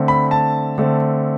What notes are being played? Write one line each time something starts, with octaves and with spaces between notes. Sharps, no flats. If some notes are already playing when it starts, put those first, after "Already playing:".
Already playing: D3 A3 C4
B5
A5
D3 A3 C4